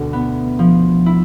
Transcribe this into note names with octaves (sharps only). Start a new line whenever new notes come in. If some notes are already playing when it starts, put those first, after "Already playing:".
Already playing: D2 B2
B3
F3
E4